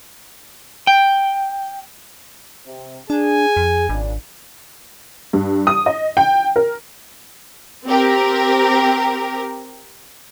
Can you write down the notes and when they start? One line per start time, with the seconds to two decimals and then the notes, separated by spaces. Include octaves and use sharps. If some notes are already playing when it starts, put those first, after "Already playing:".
0.87 G5
2.66 C3
3.10 D4 G#4 G#5
3.57 F2
3.89 G#1 A#2 C#3 D4
5.33 G2
5.67 D#6
5.86 D#5
6.17 G5
6.56 A#4
7.85 C4 G4 A#4